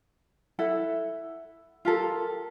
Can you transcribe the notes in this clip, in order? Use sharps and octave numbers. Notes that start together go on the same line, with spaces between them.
E4 A4 F#5
F4 G4 A4 A#4